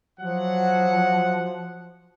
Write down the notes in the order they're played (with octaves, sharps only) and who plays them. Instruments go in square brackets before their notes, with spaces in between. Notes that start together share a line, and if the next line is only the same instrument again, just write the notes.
[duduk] F3 [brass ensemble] F#3 F#5